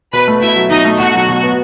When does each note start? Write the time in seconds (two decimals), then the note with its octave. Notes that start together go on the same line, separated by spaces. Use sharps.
0.13 B2 B4 B5
0.28 A3
0.42 B2 E4 E5
0.56 F#3
0.71 B2 D#4 D#5
0.85 A3
1.00 B2 F#4
1.14 F#3
1.29 B2
1.43 B3